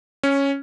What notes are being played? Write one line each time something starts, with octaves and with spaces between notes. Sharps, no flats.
C#4